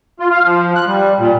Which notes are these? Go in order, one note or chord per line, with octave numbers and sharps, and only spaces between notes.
F4
F5
F3
F#6
G3
A#2